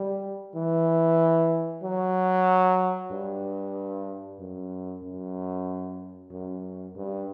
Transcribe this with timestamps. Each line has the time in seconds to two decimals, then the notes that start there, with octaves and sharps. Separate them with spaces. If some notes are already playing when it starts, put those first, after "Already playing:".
Already playing: G3
0.55 E3
1.83 F#3
3.11 G2
4.39 F#2
5.03 F#2
6.31 F#2
6.95 G2